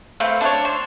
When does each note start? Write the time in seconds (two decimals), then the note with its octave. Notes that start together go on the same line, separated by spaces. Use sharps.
0.20 A3 C4 B4 F5
0.41 D4 B4 C#5
0.65 C5